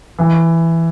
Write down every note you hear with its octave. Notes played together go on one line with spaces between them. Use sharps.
E3